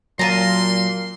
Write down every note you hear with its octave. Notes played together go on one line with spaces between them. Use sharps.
A#2 F#3 F4 A5 A#5 C6